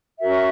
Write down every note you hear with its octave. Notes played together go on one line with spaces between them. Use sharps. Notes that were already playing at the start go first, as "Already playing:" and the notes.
C#4 F#4 A#4 E5